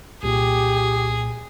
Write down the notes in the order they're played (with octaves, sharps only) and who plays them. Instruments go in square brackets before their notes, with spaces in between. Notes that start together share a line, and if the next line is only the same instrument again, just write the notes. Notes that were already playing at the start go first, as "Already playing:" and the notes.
[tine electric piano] C2 A#2 [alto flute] G4 [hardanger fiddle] G#4